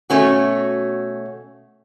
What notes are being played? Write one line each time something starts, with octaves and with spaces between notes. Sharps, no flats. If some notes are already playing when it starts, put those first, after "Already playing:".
B2 A3 C#4 F#4